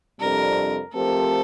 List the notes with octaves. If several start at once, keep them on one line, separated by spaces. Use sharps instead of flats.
F2 C3 G3 D4 A4 A#4
F3 A3 C4 G4 A4 A#4